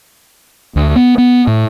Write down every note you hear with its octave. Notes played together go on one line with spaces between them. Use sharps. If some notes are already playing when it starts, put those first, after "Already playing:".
D2
B3
B3
A2